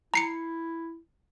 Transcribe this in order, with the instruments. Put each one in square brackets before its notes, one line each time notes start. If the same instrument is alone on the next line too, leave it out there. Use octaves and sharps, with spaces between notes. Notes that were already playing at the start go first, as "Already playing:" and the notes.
[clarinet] E4 [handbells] A#5 C7 C#7